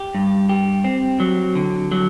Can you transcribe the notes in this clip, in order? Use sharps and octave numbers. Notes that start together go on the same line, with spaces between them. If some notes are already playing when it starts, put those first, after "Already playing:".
Already playing: G4
G2
G4
C4
F#3
D3
F#3